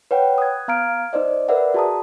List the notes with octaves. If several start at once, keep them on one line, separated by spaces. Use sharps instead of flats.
B4 C#5 F#5 G5
D#6 F#6 G#6
B3 F5 A#5 F6 G#6 D7
D#4 C5 D5 D#5
A#4 B4 D5 E5 F#5
F#4 G#4 A5 A#5 D#6